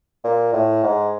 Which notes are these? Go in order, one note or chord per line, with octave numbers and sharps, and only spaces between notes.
A#2
A2
G#2